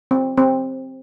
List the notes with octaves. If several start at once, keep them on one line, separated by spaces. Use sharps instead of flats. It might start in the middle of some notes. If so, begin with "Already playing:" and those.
C4
C4